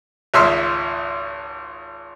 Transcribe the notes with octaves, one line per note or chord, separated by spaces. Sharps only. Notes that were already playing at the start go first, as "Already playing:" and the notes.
G#1 C#2 E5 C6 E6 F6